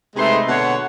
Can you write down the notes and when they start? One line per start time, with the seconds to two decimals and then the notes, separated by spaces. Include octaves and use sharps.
0.16 C3 G#3 A3 D#4 B4 C6
0.47 B2 D3 C#5 F#5